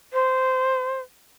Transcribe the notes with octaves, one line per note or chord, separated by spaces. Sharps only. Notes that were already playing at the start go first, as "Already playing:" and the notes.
C5